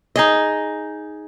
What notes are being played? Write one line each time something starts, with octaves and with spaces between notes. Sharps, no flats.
D#4 G#4 D#5